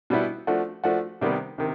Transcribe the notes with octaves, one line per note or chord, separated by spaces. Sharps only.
B2 G3 B3 E4
F3 A3 D4 F#4
F3 A3 D4 F#4
C3 D#3 G3 B3
C3 D#3